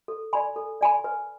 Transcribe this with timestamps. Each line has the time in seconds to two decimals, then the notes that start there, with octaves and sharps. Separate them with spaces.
0.08 A4
0.33 D5 G#5 B5
0.56 A4
0.81 D5 G#5 B5
1.04 B4